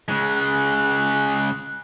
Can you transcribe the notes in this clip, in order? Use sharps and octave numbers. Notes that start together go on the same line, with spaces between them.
C#3 G#3 F#6